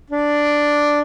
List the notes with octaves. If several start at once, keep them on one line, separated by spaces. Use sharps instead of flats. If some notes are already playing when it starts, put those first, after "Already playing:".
D4